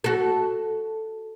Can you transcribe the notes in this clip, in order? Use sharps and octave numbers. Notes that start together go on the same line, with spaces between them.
F#4 A4